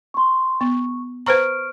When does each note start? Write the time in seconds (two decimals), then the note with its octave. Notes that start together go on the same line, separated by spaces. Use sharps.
0.14 C6 C#6
0.61 B3 C#6
1.26 B4 C5 A#5 C#6 F6 D7